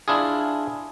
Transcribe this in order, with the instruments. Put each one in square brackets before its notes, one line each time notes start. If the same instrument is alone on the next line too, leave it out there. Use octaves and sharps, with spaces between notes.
[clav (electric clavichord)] D4 E4 F4 G#4